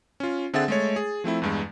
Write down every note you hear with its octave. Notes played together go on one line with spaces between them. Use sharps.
C#4 F4
D3 C4 G#4 E5 F#5 A6
G#3 A3 C#5
G#4
F3 A3 C4 E4
E2 G2 G#3